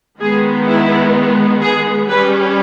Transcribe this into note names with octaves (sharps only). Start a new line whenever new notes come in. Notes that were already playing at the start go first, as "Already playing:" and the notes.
D#3 G#3 B3 G#4
E4
G#4
G3 C#4 B4